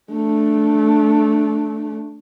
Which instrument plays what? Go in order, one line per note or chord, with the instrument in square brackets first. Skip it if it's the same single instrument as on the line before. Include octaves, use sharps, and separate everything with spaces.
[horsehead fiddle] A3 D4